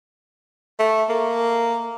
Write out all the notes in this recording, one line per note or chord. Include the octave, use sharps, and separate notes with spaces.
A3
A#3